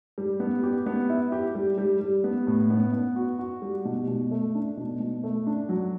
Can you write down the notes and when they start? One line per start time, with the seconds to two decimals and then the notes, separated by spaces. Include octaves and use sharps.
0.18 G3
0.40 B3
0.63 G4
0.86 B3
1.10 E4
1.32 G4
1.55 G3
1.78 G3
2.01 G3
2.24 B3
2.47 A2
2.70 B3
2.93 B3
3.16 F#4
3.39 F#4
3.62 G3
3.85 B2
4.08 B2
4.31 A3
4.55 D4
4.77 B2
5.00 B2
5.24 A3
5.47 D4
5.69 F#3